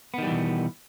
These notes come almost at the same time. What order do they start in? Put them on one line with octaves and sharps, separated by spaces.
B3 D#3 G3 E3 B2